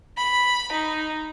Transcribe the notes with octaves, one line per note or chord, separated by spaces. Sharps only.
B5
D#4